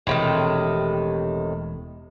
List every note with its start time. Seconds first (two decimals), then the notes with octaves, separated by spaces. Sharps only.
0.07 E1 A2 C3 D#3